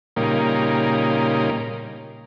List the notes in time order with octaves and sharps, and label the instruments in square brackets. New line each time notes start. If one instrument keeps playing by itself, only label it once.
[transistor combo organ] A#2 C#3 G3 A#3 D#4